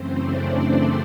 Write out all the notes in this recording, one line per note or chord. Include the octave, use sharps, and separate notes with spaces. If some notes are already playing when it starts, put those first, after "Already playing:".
Already playing: F#2 C#3 E3 A3 C4 C5
D4 D5
D4 D5